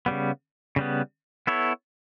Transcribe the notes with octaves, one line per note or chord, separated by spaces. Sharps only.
C#3 G3 B3
C#3 G3 B3
B3 E4 A4 C#5